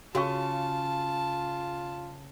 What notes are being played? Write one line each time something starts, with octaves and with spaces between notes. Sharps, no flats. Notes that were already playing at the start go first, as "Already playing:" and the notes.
C#3 F4 F#4 F5 A5 C#6